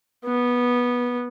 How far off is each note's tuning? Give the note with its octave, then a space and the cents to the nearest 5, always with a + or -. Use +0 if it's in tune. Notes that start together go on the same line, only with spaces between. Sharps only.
B3 -15